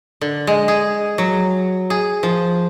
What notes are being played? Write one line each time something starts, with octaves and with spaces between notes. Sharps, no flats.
D3
G#3
G#4
F#3
G#4
F3